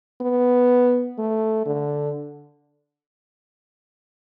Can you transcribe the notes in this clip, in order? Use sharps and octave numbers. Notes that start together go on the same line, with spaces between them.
B3
A3
D3